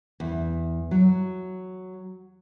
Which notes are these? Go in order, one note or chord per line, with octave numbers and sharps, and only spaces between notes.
E2
F#3